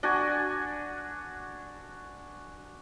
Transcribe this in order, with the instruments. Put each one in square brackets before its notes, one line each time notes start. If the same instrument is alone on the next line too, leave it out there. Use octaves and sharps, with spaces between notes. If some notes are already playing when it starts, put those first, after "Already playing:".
[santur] D4 F#4 G#5